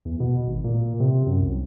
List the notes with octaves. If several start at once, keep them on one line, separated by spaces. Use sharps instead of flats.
E2
B2
G#1
A#2
C3
F#2
C2